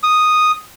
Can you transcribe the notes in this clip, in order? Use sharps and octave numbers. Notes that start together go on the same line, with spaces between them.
D#6